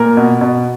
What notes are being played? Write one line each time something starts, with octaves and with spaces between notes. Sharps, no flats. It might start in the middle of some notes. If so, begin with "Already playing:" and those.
Already playing: A#2 A#4
B2
B2